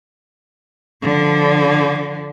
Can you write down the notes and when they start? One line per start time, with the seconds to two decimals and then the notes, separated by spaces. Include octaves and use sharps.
1.02 D3 F3